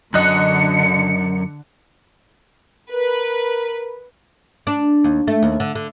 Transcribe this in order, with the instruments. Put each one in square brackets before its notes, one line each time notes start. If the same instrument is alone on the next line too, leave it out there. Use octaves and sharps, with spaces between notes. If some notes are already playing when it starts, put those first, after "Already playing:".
[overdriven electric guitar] F#2 [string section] D3 C#7 [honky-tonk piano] D#5 F#6
[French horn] A#4 [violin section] B4
[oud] D4
D#2
A3
D#2
D3
D3